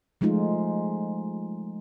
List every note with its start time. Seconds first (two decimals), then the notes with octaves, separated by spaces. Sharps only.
0.21 F3 G#3 A3 D#4 F4